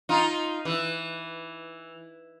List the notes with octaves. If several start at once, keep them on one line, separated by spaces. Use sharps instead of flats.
D#4 F4
E3